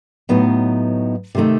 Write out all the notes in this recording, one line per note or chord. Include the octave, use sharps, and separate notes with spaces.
A2 F#3 B3 D#4
C3 D#3 A3 D#4